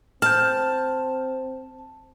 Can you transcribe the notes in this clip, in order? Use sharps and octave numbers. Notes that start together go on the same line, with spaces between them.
C4 A5 F6 G6